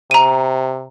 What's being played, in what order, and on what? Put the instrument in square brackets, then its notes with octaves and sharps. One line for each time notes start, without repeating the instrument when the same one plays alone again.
[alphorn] C3 [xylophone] A#5 D#7